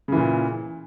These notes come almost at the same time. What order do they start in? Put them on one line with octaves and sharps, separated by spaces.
C#3 E3 A#2